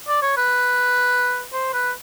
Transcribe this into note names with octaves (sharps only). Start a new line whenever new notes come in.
D5
C#5
B4
C5
B4